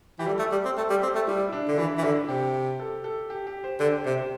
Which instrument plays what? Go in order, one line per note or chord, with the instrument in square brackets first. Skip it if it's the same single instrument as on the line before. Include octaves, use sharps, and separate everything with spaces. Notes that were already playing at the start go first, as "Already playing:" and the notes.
[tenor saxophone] E3 [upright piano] G4
[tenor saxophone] G3 [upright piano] A4
[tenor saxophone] A3
G3
C4
[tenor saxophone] A3 [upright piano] A4
[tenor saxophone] G3
[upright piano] G4
[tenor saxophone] C4
A3
[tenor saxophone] G3 [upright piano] E4
[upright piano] E4
D4
[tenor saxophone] D3
[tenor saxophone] E3 [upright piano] E4
[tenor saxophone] E3
[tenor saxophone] D3 [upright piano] E4
[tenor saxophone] C3 [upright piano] G4
[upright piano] A4
A4
G4
G4
C5
[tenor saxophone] D3 [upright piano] C5
[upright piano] G4
[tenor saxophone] C3 [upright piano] C5
[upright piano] C5